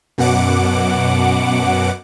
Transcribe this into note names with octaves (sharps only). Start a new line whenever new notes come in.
F#2 B2 F#5 D6